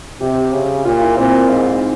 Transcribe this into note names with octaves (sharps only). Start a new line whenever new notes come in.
C3 G4
C#3
A#2 F4
E4
A#2 C4
G#2